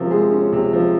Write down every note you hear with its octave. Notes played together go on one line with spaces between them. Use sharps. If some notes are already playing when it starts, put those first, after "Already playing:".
Already playing: C3 F3 G#3 C#4 A#4
G#3 G#4
C#4
C3
F3